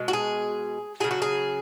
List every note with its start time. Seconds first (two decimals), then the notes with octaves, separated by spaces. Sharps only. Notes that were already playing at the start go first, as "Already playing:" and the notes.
Already playing: B2 G#3
0.08 F#4
0.13 G#4
1.00 C#3 F#3 G#4
1.11 F#4
1.22 G#4